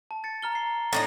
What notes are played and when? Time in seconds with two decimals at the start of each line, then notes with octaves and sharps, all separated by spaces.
0.11 A5
0.24 A6 C#7
0.42 A#5 F6 G7
0.55 C7
0.93 A2 D4 D#4